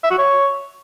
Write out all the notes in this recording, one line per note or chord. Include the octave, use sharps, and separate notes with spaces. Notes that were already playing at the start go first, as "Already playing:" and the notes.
E5
F#4
C#5